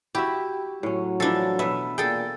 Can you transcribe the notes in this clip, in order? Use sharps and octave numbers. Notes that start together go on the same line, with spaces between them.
E4 F#4 G4 E5
A2 F#3 C#4
E3 F3 D4 A4
B2 B3 E5
A#2 G#4 A4 G5